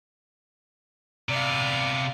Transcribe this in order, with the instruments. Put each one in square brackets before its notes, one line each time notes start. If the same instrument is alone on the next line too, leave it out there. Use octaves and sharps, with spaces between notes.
[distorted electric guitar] C3 B3 [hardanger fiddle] D5 F5